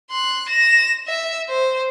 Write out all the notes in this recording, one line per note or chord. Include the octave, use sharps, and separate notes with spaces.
C6 F#6
A#6 E7
E5
C5